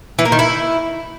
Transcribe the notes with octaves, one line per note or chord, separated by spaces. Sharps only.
E3
A#3
D#3
E4